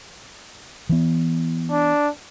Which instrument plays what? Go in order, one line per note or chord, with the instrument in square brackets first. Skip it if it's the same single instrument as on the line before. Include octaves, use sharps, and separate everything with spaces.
[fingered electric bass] E3 B3
[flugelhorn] D4